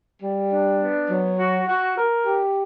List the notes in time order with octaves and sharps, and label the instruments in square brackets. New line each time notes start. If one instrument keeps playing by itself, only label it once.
[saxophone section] G3
D4
B3
F#3
F#4
F#4
A#4
G4